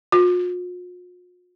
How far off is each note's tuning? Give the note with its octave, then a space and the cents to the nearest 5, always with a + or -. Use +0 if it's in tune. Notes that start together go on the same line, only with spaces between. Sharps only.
F4 +45